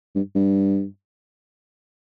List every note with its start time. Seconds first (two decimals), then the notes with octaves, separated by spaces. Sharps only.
0.15 G2
0.35 G2